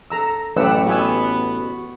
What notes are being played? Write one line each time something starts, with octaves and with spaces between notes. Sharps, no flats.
A4 A#5 E6
A1 F#2 A2 A3 G4 B4 F#5 E6
B3 F#4 G4 G#5 E6